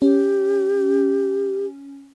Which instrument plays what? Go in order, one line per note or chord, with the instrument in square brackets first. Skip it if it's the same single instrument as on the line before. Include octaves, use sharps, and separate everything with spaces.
[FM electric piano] C#4 [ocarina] G4